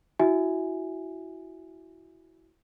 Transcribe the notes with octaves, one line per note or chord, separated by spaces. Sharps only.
E4 F#4 E5 G#5